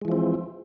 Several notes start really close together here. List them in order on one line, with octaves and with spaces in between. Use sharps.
G#3 E3 F3 C4